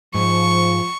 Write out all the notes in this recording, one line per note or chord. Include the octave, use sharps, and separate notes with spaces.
G#2 F3 C#6